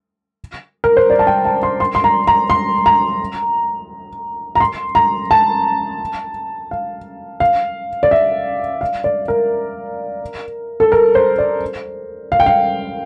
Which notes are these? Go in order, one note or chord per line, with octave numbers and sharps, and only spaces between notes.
A#4
C5
D5
A5
G5
A5
C6
C6
C6
A#5
A#5
C6
A#5
A#5
C6
A#5
A5
F5
F5
D5
E5
F5
D5
A#4
A4
A#4
C5
D5
F5
G5
F5